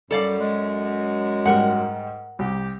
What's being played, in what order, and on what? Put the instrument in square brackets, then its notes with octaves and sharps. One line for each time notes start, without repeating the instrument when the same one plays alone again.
[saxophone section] F#2 [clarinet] G3 [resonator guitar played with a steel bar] A4 D5 F5
[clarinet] G#3
[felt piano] G#2 G3 [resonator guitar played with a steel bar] A#4 F#5
[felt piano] C2 [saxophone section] G4